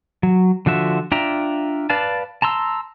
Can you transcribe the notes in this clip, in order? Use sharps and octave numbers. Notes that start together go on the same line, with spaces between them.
F#3
D3 F3 F#4 E5
D4 F4 E5 G5 A#5
B4 D5 F5 A5
A5 A#5 C6 E6